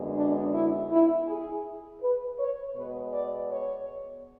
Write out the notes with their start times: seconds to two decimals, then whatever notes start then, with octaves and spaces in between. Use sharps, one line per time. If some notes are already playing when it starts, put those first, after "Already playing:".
Already playing: F#2 D3 G#3 B3
0.16 D4
0.54 E4
0.91 E4
1.28 G#4
2.01 B4
2.39 C#5
2.75 B2 G#3 B3 B4
3.13 D5
3.50 C#5